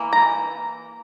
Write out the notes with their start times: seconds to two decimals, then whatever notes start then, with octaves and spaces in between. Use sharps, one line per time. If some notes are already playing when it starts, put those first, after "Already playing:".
Already playing: E3 A#3
0.13 A#5